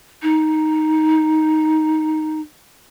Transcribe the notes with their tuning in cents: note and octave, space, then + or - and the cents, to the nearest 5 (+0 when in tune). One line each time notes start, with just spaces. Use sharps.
D#4 +5